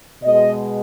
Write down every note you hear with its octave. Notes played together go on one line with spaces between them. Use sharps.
B2 G#3 D#5